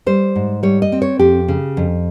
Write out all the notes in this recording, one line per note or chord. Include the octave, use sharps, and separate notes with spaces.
G3 C5
G#2
G3 C#5
D#5
C4
C#5
F2 G4
C#3
F2